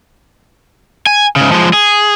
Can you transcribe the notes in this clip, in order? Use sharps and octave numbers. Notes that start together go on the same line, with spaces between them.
G#5
G#2 C#3
F3 G#3
G#4